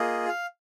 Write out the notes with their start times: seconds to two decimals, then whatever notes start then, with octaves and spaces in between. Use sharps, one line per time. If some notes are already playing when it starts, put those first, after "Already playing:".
Already playing: A#3 F4 G#4 D#5
0.28 F5